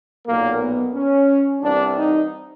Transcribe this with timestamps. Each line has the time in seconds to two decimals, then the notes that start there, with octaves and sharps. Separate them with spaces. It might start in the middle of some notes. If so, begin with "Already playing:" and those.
0.27 B1 A#2 A#3
0.60 B3
0.95 C#4
1.62 C2 C3 E3 D4
1.97 D#4